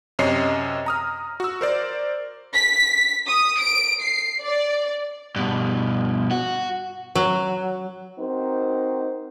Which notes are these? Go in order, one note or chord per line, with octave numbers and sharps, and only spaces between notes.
F#2 C3 C#5 D#5 C7
A#5 D#6 F6
F#4 E6
A#4 C5 D5
B6
D#6
D7
C7
D5
G2 B2
F#4
F#3
C4 D#4 F#4 A#4 C5